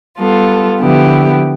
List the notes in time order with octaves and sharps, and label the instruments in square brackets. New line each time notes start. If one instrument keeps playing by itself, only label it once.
[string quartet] G3 B3 F4 A4
D3 F3 B3 E4 G4